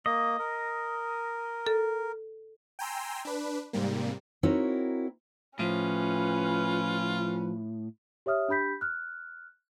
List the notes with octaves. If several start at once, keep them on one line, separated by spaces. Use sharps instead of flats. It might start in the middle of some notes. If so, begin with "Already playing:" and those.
A#3 D#5
A#4
A4
G5 G#5 A#5 C6 E6
D4 B4
G#2 C3 G3 A#3
C4 D#4 E4 F#4 A#4 C#5
A2 F3 C#4 F4 B4
G4 C#5 E5 D#6 F6
D4 G4 B5 G6 B6
F6 F#6